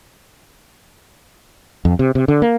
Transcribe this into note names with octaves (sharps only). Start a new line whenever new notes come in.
F2
C3
C3
D3
A#3